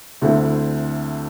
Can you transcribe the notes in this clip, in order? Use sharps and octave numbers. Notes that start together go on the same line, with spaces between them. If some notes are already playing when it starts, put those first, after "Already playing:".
D2 D3 A3 C4 E4